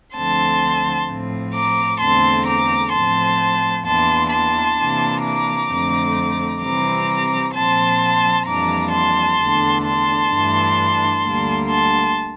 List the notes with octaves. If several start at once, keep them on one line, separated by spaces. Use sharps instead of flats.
D2 D3 F3 C4 A5 C6
A2 F3 C4
A#5 D6
E2 D3 A3 C4 A5 C6
A#5 D6
A2 F3 C4 A5 C6
E2 E3 A#3 D4 A5 C6
A5 C6
C3 E3 A#3 D4
A#5 D6
F2 D3 A3 C4
C3 E3 G3 C4 A#5 D6
A#2 F3 C4 A5 C6
F2 E3 G3 A#3 D4 A#5 D6
A5 C6
E2 D3 A3 D4
A5 C6
G2 E3 A3 D4
D2 D3 G3 A#3
A5 C6